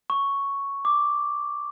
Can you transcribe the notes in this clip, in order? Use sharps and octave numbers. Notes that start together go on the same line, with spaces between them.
C#6
D6